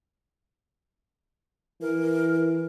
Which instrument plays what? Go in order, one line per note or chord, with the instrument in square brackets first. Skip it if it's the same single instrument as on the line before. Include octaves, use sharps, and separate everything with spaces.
[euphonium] E3 [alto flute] A#4